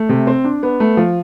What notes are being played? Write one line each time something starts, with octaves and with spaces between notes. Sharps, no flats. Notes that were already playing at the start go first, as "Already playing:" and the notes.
Already playing: A3
C3
C4
D4
B3
A3
F3